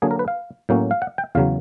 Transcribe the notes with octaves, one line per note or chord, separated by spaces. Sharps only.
D3 F#3 A#3 D4 G#4
A#4
B4
F5
A2 F#3 A#3 C#4
F5
F#5
G5
E2 C#3 F#3 F5